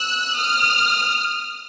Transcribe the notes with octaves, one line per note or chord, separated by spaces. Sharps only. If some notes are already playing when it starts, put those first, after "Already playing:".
Already playing: E6 F#6
D#6 F6